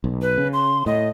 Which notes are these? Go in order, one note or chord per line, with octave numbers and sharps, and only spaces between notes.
B1
B4
C#3
C6
A2 D#5